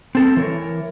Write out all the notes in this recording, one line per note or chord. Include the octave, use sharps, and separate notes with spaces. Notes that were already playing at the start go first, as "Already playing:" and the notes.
C4 A4
E3 A#4 C#5